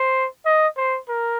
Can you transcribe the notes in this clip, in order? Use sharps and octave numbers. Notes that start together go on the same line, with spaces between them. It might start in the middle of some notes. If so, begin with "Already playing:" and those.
Already playing: C5
D#5
C5
A#4